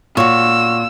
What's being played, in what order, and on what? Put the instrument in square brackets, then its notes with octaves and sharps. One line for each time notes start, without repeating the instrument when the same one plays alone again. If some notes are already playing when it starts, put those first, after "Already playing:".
[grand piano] A#2 [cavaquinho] F#4 C#5 [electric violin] E6